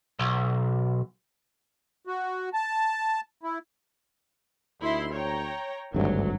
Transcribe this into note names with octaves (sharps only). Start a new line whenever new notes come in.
B1
F#4
A5
E4
D2 D#4 E4 C6
C#5 G5 A#5
G#1 D2 G2 F#3